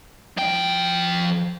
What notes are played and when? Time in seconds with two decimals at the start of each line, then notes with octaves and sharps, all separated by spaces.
0.37 F3 G5